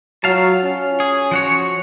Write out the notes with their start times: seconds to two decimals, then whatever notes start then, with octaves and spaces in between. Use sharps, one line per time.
0.24 F#3 F4 F5 A5
0.64 C#4
1.00 G#4
1.31 F3 F#4 C#5